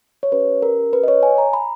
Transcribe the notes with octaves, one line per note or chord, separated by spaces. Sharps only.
C#5
C#4 G4 B4
A#4
B4
D#5
C#5
G#5
A#5
B5